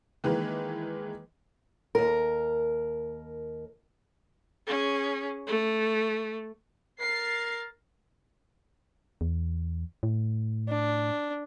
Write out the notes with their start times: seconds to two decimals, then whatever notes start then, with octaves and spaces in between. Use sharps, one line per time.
0.24 D#3 E3 G#3 A#3 B4
1.95 D#2 A#4
4.67 C#4 G#4
5.47 A3
7.01 A#4 A6 C7
9.21 E2
10.03 A2
10.68 D4